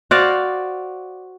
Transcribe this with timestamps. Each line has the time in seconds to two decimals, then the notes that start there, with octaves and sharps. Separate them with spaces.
0.11 F#4 C5 D5 F5